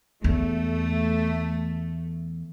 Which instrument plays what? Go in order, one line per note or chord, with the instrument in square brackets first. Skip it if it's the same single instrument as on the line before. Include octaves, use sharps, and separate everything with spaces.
[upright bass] E2 [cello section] A3